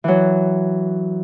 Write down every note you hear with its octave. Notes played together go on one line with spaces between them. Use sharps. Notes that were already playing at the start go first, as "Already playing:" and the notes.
E3 F#3